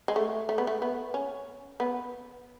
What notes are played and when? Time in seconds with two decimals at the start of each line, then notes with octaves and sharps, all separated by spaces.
0.08 G#3
0.16 A3
0.49 A3
0.58 B3
0.67 A3
0.82 B3
1.14 C#4
1.80 B3